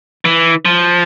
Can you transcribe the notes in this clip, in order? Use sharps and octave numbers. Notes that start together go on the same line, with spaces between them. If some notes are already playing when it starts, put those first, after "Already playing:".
E3
F3